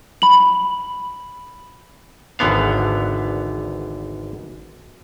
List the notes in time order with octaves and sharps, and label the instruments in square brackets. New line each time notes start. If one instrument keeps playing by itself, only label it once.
[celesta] B5 F#7
[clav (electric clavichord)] G#1 E2 D3 B3 F5